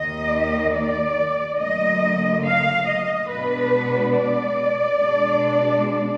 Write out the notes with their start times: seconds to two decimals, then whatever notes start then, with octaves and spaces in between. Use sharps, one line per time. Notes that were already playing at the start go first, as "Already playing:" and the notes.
Already playing: D#2 D#3 A#3 D#5
0.74 D5
1.59 D2 D3 F#3 A#3 D#5
2.45 F5
2.86 D#5
3.29 B2 G#3 B3 D4 B4
4.14 D5
5.00 B2 G#3 D4